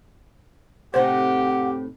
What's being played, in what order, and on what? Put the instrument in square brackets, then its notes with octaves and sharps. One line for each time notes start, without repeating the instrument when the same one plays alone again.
[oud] A2 C3 D#4 [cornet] G4 [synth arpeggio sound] C5 [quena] F#5